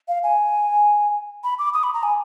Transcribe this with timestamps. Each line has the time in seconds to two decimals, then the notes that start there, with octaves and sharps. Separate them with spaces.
0.08 F5
0.23 G#5
1.44 B5
1.59 D6
1.74 D#6
1.84 B5
1.94 A#5
2.03 G#5